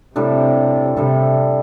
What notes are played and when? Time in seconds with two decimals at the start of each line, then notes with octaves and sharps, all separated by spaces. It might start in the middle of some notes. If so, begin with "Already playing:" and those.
0.15 A2 C3 G3 D4 A4
0.97 A2 C3 G3 D4 A4